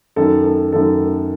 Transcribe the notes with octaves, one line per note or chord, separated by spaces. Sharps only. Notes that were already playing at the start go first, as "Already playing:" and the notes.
F#2 D#3 A4
A4
F#2 D#3 A4